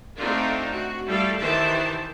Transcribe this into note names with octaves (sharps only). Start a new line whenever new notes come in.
A3 C4 D4 D#4 F4
F#4
G3 A3 E4 A4 F5
D#3 E3 G4 C5 E5 A5